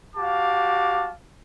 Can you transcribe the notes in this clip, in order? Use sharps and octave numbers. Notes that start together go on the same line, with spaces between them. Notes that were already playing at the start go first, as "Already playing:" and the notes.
F#4 G4 F5 A5 D6